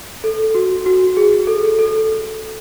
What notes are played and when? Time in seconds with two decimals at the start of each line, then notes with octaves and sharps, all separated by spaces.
0.24 A4
0.55 F#4
0.86 F#4
1.17 G#4
1.47 A4
1.79 A4